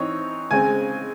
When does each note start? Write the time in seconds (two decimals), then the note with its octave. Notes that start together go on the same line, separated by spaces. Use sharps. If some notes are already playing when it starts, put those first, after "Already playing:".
Already playing: E3 C4 D#4 C#5
0.51 C#3 G#3 C4 G#5